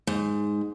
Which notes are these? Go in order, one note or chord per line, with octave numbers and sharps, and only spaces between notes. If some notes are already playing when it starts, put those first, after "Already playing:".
G#2